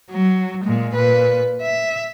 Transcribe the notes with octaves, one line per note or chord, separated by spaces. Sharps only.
F#3
A#2 G#3
A#2 B4
E5